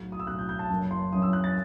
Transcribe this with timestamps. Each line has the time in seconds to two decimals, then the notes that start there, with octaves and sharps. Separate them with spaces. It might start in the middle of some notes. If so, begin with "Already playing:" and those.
Already playing: B1 A2 F#3
0.12 D#6
0.20 E6
0.27 B1 A2 F#3 F#6
0.39 G6
0.49 G6
0.59 A5
0.70 F#1 F#2 E3
0.91 C6
1.12 F#1 F#2 E3 D#6
1.22 E6
1.33 F#6
1.44 A6